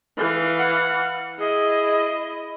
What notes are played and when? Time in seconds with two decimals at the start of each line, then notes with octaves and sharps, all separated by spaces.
0.17 E3 F5
0.59 F#5
1.40 E4 G#4 D#5